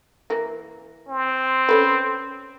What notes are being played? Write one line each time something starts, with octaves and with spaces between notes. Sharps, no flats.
E3 A#3
C4
C#4 A4 B4